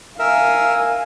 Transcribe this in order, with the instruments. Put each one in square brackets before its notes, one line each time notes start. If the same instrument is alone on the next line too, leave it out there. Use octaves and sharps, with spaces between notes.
[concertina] A#4 E5 [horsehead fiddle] F5 G#5